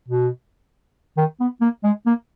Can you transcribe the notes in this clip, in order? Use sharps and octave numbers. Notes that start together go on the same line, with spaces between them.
B2
D#3
B3
A#3
G#3
A#3